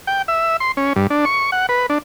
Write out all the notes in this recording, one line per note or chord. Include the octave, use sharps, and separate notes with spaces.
G5
E5
C6
C#4
G2
D4
C#6
F#5
B4
D4